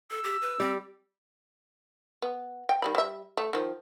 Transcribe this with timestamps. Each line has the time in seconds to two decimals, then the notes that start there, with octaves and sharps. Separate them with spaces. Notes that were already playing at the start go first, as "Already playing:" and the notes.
0.10 A4 E6
0.24 G4
0.42 B4
0.60 G3 C4 G4
2.22 B3
2.69 G5
2.82 D#3 G3 B5
2.95 G3 E5
3.37 A3
3.53 D#3 F3